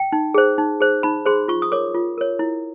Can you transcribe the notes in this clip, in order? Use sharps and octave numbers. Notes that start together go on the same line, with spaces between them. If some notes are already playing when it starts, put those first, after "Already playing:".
Already playing: G5
D#4
G#4 C5
D#4
G#4 C5
D#4 B5
G#4 C5 C6
F4 C#6
D#6
A#4 C#5 D6
F4
A#4 C#5
E4